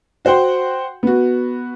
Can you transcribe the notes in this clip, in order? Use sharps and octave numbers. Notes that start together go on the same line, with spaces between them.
F#4 C5 F#5 G5 C6
B3 F#4